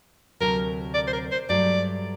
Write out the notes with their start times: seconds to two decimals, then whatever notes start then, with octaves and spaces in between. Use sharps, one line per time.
0.40 D2 C3 F#3 A#4
0.94 D5
1.07 C5
1.13 A#4
1.31 C5
1.49 G2 F#3 A3 D5